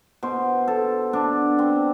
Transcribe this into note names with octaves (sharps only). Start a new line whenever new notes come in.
B2 C5
A4
B2 D4
C4